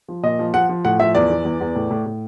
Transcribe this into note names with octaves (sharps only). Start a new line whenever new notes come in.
F3
A#2 D#5
F3
F3 F#5
F3
A2 F#5
F3 E5
E2 D5
E3
E2
E2
A2
A2
A2